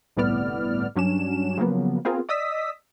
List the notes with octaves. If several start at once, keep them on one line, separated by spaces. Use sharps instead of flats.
G1 C2 A2 B3 D5 F6
G2 F#3 C#4 D4 E7
C#3 F3 F#3 A#3 B3
B3 C4 F4 G#4 A#4
D5 D#5 D#6 E6 B6